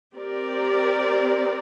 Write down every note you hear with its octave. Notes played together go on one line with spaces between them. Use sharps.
C4 G4 A#4 D5